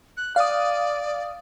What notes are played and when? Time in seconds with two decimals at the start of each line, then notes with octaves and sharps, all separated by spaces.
0.17 F#6
0.36 D5 F5 D#6